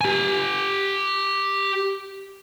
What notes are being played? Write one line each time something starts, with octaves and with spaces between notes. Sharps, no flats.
G4 G#5